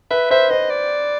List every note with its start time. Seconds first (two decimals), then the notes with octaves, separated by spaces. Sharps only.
0.11 B4 E5
0.31 C5 E5
0.50 C5 D#5
0.70 D5